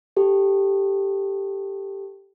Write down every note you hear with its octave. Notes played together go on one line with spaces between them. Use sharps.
G4 A4